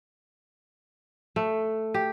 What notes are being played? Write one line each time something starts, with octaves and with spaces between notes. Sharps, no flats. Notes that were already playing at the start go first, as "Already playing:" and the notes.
A3
G4